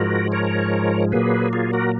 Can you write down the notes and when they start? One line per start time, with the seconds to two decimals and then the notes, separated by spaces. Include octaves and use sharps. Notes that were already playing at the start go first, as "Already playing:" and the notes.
Already playing: G#2 F3 G#3 F#4 A#4
0.32 A#4 C#5
1.12 A#2 F#3 A#3 G#4 B4
1.53 F4 G#4
1.73 F#4 A#4